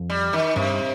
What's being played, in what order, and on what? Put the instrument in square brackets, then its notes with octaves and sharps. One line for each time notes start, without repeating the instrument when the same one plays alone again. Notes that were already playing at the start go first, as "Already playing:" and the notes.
Already playing: [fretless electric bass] F2
[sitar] G3
D#3
[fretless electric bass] G2 [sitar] C3